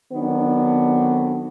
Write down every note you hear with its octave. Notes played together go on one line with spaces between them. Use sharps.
D3 D#3 F#3 B3 C4 D4